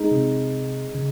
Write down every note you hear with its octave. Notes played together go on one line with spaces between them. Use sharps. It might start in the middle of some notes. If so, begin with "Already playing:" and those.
Already playing: G#3 D#4
C3
C#3